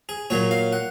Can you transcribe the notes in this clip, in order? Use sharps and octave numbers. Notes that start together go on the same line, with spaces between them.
G#4
A#2 F#3 A#3 C#5
F5
F#5